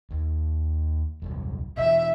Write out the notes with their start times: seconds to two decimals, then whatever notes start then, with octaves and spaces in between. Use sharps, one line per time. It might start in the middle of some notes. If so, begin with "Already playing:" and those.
0.10 D#2
1.22 D#1 C2 F#2
1.77 B2 D3 E3 E5